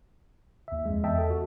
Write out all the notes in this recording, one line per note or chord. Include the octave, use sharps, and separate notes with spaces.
D#2 E5
F2 G#3
E2 D#5 E5 G5 A5
A4
F#4